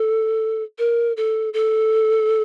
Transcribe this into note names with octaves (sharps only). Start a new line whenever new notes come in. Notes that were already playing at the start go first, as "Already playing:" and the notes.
Already playing: A4
A#4
A4
A4